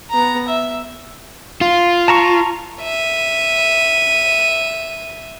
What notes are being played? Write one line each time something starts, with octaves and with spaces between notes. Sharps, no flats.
B3 A#5
E5
F4
A5 A#5 C#6
E5 D#7